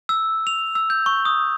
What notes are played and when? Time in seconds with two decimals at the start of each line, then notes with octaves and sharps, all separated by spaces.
0.09 E6
0.47 F7
0.75 E6
0.90 G6
1.06 C#6
1.25 D#6